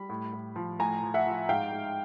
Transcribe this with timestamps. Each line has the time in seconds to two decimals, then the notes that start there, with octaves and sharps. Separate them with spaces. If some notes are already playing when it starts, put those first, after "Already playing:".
Already playing: G3 B5
0.09 A2
0.33 A2
0.56 F3
0.79 A2 G#5 A#5
1.03 F3
1.14 E5 F#5
1.26 F3
1.49 G#2 F5 G5
1.72 G#2